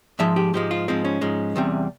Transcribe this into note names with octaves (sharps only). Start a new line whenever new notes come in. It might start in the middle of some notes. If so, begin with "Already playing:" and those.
G#2 F3 G#3 E5
G4
G#2 F3 G#3 G4
F4
G#2 F3 G#3 C4
C#4
G#2 F3 G#3
E2 C3 G3